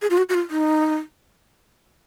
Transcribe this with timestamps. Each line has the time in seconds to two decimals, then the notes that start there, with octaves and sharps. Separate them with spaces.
0.02 G#4
0.10 F4
0.18 F#4
0.29 F#4
0.34 F4
0.51 D#4